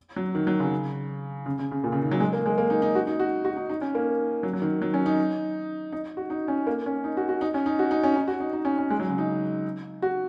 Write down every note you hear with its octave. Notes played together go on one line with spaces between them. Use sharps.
F#3
D#3
F#3
C#3
C#3
C#3
C#3
A#2
C#3
D#3
F#3
G#3
A#3
G#3
A#3
D#4
D#4
F#4
D#4
F#4
F#4
D#4
D#4
C#4
A#3
F#3
F#3
D#3
F#3
C#4
D#4
D#4
F#4
D#4
C#4
A#3
C#4
D#4
F#4
F#4
D#4
C#4
D#4
F#4
D#4
C#4
D#4
F#4
D#4
D#4
C#4
C#4
G#3
F#3
C#3
D#4
F#4